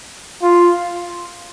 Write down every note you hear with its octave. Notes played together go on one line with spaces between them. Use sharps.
F4